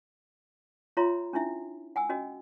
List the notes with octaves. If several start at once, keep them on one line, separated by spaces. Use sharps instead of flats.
F4 C#5 E5 A#5 C6
C#4 D4 E4 E5
F#5 G#5 E6
C#4 F#4 D#5